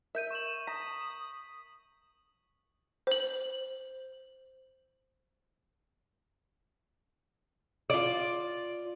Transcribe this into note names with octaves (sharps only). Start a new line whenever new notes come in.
A#4 E5 G6 D#7
C#6 E7 F#7
A#5 D#6 B6
C5 F#7
F4 D5